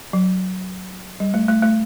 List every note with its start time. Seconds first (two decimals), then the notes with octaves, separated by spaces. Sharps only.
0.13 F#3
1.20 G3
1.34 A3
1.49 A3
1.63 A3